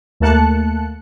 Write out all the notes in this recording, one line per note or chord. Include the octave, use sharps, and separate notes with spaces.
D#2 A3 A#3 A5 F#6 C#7